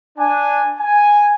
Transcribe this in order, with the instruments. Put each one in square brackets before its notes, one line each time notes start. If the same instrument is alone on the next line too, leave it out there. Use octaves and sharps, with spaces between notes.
[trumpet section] D4 G#5
G#5